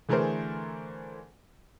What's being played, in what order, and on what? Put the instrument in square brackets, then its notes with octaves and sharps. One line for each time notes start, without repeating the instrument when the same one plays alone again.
[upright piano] D3 E3 A3 G#4 A#4 C5